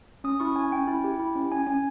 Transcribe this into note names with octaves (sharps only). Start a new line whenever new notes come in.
C#4 D#6
E4 C#6
C#4 G#5
C#4 G5
E4
G4
E4
C#4
C#4 G#5
C#4 G#5